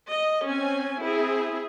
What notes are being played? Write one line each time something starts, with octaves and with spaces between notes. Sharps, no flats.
D#5
C4 C#4 G#5
C4 E4 G#4